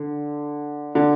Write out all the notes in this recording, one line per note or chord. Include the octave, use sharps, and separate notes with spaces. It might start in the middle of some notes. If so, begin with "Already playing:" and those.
Already playing: D3
D3